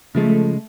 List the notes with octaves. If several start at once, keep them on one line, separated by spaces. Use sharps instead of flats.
C#3 F3 G#3 A3